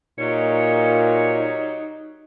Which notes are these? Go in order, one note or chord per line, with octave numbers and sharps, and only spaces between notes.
A#2 F#3 G3 D#4 C#5